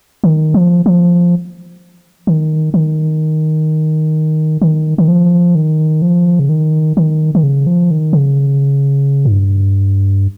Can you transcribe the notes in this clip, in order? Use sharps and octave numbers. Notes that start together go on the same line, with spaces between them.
D#3
F3
F3
D#3
D#3
D#3
D#3
F3
D#3
F3
C#3
D#3
D#3
D#3
C#3
F3
D#3
C#3
G#2
G2